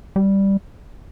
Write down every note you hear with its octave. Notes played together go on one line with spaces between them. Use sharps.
G3